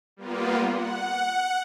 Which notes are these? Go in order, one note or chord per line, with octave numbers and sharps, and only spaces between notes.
G3 A#3 B3 F4
F#5